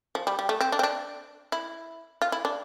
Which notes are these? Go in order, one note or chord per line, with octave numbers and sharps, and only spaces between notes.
F3
G3
G3
A3
C4
D4
C4
D4
E4
F4
E4
D4